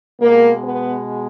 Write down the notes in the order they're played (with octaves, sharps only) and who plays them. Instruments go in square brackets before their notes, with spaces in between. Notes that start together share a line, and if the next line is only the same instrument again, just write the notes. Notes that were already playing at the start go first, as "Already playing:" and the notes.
[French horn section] B2 G#3 A#3
B3